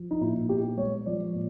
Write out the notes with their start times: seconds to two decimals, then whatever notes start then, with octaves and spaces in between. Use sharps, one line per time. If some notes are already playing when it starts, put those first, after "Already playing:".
Already playing: F3
0.11 D#4
0.21 A#2 E4
0.49 B3 G4
0.77 G#3 C#5
1.06 F3 D5
1.34 A#2